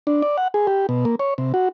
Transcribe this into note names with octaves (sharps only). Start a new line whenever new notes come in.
D4
D5
F#5
G#4
G4
B2
A#3
C#5
C3
F#4